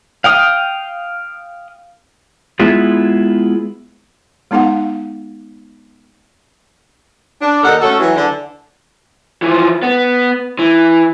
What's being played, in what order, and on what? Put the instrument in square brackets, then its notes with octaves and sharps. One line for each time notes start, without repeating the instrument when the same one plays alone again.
[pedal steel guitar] F5 G5 D#6
[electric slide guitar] G#3 B3 E4 F4 G#4
[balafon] G#3 B3 D#4 F5 F#5
[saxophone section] D4
D#2 D#4 A4 A#4 F#5
A3 C#4 F#4 A4
E3 F#3
D3
[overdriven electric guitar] E3 F3
B3
E3